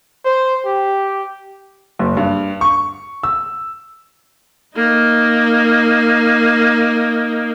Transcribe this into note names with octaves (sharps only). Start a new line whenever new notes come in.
C5
G4
F#1
G2
C#6
E6
A#3 D#4